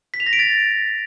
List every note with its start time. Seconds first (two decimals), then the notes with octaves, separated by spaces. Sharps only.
0.14 B6
0.20 F7
0.26 A#6
0.33 D7
0.39 A6